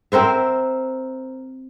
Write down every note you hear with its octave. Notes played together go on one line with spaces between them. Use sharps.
C4 A#4 C5 E5